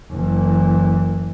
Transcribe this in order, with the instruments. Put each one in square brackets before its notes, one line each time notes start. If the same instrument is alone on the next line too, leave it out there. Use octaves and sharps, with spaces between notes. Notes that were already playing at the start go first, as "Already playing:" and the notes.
[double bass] F#1 E3